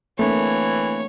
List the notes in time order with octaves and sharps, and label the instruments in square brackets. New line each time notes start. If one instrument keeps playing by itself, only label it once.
[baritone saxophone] E3 [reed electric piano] A3 [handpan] A#3 C4 D4 [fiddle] C#5